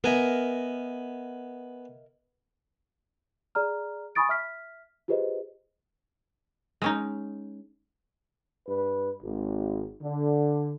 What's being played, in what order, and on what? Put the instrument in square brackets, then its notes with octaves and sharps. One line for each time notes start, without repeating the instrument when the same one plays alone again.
[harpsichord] B3 G#5 [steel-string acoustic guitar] A#4 D#5 E5
[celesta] G#4 D5 A#5 F6
G#5 B5 C#6 D#6 A6 D7
E5 F6 B6
F4 G4 G#4 B4 C5 D#5
[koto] G#3 C#4 D#4
[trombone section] G2 B4
G#1
D3